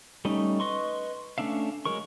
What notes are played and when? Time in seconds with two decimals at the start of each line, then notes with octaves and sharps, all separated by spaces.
0.25 G3 A3 C#4 D#4
0.60 B4 D#5 C6 C#6
1.38 A3 C#4 D4 E5 F5
1.85 F#3 G#3 A#4 C#6